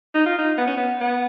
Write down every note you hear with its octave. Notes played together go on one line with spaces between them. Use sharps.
D#4
F4
D#4
B3
C#4
B3
B3